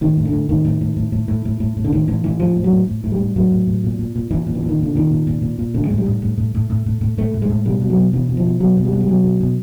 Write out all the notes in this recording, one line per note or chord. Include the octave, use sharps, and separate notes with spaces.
A2 D#3
A2
D3
A2
A2 D#3
A2
A2
A2
A2
A2
A2
A2
A2
D3
A2 D#3
A2 E3
A2 E3
A2 F3
A2
F#3
A2
A2
A2
G3
A2
A2 F#3
A2
A2
A#2
A#2
A#2
A#2 E3
A#2
E3
A#2
D#3
A#2 D3
A#2 D#3
A#2
A#2
A#2
A#2
A2 D3
A2 G#3
G3
A2
A2
A2
A2
A2
A2
A2
A2 A3
A2
G#3
A2
B2 G3
B2
F#3
B2
B2 E3
B2
F3
B2
B2 F#3
B2
G3
B2
G3
B2 F#3
B2
B2